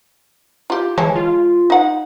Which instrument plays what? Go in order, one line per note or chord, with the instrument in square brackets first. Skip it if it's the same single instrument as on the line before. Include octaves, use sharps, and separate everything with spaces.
[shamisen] F4 G4
[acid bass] E3 [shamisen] G#3 C#5 A5
[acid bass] F4
[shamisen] D#4 F#5